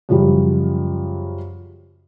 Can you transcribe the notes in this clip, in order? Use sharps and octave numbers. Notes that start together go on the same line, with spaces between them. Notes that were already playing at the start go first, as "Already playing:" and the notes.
F#2 C#3 F3 G3